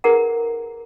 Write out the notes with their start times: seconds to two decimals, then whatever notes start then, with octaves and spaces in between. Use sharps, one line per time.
0.04 D#4 G#4 A#4 B4 F#5 A#5